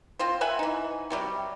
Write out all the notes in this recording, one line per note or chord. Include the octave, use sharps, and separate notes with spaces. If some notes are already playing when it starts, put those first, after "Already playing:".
C4 F4 C5
B4 E5 F#5 G#5
E3 D#4
C3 F#3 G3